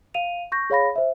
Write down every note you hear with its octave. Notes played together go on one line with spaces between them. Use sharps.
F5 D#7 F7
C#6 G6 A#6
G#4 C#5 F5 B5 A#6
C5 E5